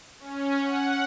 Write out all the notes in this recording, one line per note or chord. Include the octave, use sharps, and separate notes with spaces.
C#4
F#5